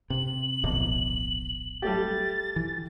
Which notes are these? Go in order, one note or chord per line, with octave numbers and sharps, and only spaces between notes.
C3 F#7
D1 A#1 B2
G3 A3 G4 A6
E3